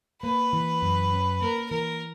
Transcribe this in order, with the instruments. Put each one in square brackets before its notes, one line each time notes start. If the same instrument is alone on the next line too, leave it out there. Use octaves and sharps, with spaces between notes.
[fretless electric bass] A#3 [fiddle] B4
[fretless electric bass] E3
F#2
C#4
[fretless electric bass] A#3 [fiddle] A#4
[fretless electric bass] E3 [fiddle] A#4